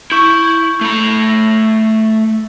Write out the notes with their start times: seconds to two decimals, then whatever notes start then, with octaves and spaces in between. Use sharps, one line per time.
0.12 E4 C#6 G6
0.81 A3 B5